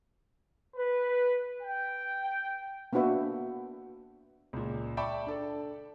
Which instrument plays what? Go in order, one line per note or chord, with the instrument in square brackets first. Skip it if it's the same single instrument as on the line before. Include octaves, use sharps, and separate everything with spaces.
[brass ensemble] B4
G5
[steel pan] A#3 B3 D4 F#4 B4 E5
[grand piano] C#2 A#2
D5 E5 G5 A5 B5 C#6
D4 A4 D5